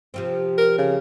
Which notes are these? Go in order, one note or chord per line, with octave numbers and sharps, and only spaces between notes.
C3 F3 C4
A#4
C#3